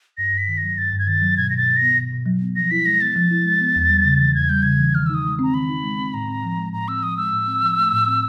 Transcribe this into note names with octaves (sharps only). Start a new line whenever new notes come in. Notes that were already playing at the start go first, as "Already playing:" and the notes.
G2 A#6
G2
B6
D#3
A#6
F#3
G2 A6
G2
G#6
D#3 A6
F#3
B2 G#6
B2 A#6
A6
F#3
A#6
B3
B2
B2
F#3
B3
F3 A#6
E4 B6
G#3 A#6
B3 A6
F3
E4
G#3
B3
E2
G3
C#3
E3
E2 G#6
G3 G6
C#3 G#6
E3
D#3 F6
E6
D#4 D#6
G#3
C4 A#5
D#3 B5
D#4
G#3
C4
A2 A#5
C4
F3
G#3
A2 A#5
C4 E6
F3 D#6
G#3 E6
A2
C4
F3
A3
A2
C4